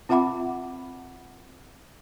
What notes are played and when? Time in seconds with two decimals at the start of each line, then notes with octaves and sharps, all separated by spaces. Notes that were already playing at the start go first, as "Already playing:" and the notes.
0.09 C4 F4 E5 F#5 B5 D6